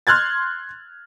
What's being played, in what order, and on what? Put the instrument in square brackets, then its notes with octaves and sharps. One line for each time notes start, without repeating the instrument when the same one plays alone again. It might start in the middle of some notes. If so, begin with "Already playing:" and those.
[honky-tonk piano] C6 F6 F#6 G#6 A6